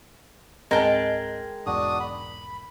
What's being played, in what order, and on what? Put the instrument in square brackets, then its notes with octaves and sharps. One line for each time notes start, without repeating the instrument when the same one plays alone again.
[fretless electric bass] C#2 G#2 C4 [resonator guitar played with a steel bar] G#3 [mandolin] A#4 G5 A5
[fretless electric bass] B1 E2 G#2 [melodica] D4 F#4 D#6
[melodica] B5